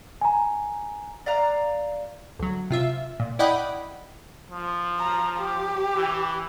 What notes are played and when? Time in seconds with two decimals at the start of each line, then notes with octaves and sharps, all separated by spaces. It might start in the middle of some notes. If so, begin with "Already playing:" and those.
0.21 G#5 A#5
1.26 D5 F5 A#5 F#6
2.39 D2 F#3
2.70 C3 F4 E5
3.20 A#2
3.39 E4 D5 D#5 F#5 G5 B5
4.51 F3
4.99 A#5
5.39 G4
5.96 E3